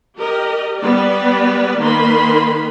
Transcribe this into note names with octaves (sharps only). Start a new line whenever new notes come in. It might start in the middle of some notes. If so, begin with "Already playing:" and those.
G4 A#4 D#5
G3 B3 B4 D5
D#3 A#3 B4 B5 C6